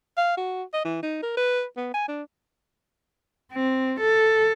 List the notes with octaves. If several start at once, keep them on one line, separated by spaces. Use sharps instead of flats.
F5
F#4
D#5
E3
D#4
A#4
B4
B3
G#5
D4
C4
A4